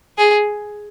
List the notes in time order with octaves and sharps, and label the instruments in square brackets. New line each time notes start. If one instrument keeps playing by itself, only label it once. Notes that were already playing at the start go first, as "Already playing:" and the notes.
[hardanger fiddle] G#4